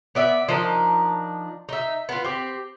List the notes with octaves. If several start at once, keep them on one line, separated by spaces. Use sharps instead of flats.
B3 D5 E5
F3 D4 D#4 A#4
D#4 E5
B3 F4
C4 G4